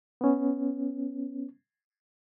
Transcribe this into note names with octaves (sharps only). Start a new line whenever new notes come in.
B3 C#4